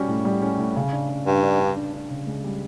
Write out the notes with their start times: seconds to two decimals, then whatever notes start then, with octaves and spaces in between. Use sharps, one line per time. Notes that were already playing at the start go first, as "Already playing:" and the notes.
Already playing: G3 C#4 F#4
0.08 A2
0.25 G3
0.42 C#4
0.58 A2
0.76 C#3
0.92 D4
1.09 C#3
1.26 G2 D4
1.43 D4
1.60 D4
1.77 D4
1.93 D4
2.10 C#3
2.26 C#2
2.44 G3